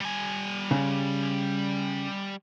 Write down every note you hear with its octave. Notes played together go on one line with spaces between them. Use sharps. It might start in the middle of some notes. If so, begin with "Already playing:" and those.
G3 G#5
C#3